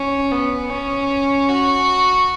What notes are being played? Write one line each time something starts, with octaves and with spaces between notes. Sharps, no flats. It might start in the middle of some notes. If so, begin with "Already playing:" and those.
Already playing: C#4
B3
C#4
F#4